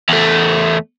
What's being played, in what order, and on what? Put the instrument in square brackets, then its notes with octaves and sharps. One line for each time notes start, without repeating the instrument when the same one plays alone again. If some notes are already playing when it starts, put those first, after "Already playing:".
[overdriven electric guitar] E2 A3